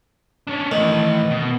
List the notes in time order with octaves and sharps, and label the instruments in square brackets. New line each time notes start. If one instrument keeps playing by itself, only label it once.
[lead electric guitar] C#4 D4
[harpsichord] D#3 [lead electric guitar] E3 A3
[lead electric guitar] B2